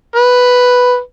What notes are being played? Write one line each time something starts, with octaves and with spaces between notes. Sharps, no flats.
B4